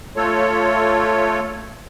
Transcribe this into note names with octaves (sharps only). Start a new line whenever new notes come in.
A3 F4 A4 C#5